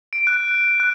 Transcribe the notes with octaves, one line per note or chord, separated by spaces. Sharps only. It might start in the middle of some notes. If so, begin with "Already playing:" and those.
D7
F#6
F#6